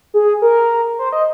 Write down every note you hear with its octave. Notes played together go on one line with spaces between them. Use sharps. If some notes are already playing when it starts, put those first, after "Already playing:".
G#4
A#4
C5
D#5